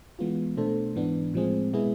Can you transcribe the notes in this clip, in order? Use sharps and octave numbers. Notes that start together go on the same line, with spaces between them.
E3 G#3 B3 F4
B2 A3 D4 A4 C5
G#2 E3 B3 D4
A2 F3 G#3 C4 G#4
B2 G#3 B3 E4 G#4